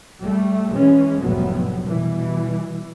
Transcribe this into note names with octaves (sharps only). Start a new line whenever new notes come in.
G3 A3
E3 G#3 C#4
F1 A2 D3 F#3 G3 B3
B2 E3 G3